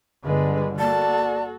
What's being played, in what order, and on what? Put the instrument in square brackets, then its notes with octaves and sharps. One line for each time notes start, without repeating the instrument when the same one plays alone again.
[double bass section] G1 D3 [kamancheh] G#3 B4
[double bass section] A#3 [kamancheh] F#4 A4 [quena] D5 [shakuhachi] A5